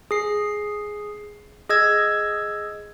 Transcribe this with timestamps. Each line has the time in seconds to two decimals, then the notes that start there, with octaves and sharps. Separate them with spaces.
0.11 G#4 C7
1.69 G#4 D#5 E6 G#6